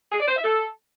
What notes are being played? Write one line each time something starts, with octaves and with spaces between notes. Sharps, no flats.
G#4
D5
C5
E5
A4